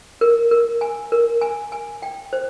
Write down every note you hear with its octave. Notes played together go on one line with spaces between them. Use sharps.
A#4
A#4
G#5
A#4
G#5
G#5
G5
C5